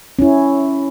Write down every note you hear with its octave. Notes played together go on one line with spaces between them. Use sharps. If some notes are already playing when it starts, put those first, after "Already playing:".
C#4 E4